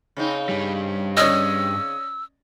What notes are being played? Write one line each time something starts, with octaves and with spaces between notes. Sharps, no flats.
C#3 C4 D#4
G2 G3
C#4 D5 D#5 E6